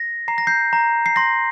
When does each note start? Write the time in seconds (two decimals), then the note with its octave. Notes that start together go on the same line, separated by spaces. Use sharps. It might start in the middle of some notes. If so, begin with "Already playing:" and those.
Already playing: A#6
0.28 A#5 C7
0.38 A#6
0.47 G6 C7
0.73 A#5
1.06 C7
1.16 C6 A#6